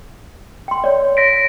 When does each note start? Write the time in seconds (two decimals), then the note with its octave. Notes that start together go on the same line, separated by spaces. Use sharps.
0.68 G5 C6
0.84 C#5 D5
1.17 A#6 B6 D7